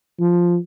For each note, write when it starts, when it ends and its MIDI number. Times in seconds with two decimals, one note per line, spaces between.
0.20 0.57 53